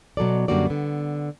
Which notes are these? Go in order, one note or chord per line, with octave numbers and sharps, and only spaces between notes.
B2 F#3 A4 D5
F#2 D3 G3 A#3 F#4 D5
D3 B3